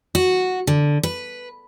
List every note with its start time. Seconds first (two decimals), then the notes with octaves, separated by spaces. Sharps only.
0.15 F#4
0.67 D3
1.03 B4